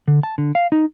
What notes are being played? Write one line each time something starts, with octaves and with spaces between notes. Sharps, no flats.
D3
A5
D3
F5
D#4